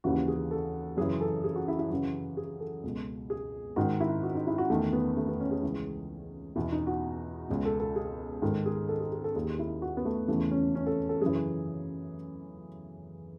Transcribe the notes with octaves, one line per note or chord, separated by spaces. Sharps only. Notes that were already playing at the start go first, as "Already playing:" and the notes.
D#2 C#3 E3 F#4
G#4
A4
F#2 C#3 E3 G#4
A4
G#4
F#4
E4
E4
F#2 C#3 E3 F#4
G#4
A4
C#2 B2
G#4
G#2 D#3 F#4
E4
F#4
D#4
E4
F#4
E2 D#3 A3
B3
A3
B3
C#4
G#4
C#2 C#3 E3
E2 B2 E4
D#4
F#4
C#2 B2
A4
A4
G#4
G#2 D#3 A4
G#4
A4
G#4
G#4
A4
D#2 D#3 G#4
E4
F#4
B3
A3
E2 C#3 E3 A3
C#4
C#4
A4
A4
F#2 C#3 E3 G#4